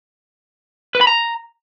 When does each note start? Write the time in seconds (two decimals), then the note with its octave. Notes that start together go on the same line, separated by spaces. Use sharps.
0.95 B4
1.01 B5
1.07 A#5